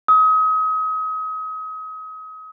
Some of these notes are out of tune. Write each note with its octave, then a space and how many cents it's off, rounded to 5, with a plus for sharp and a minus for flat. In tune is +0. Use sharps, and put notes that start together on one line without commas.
D#6 +35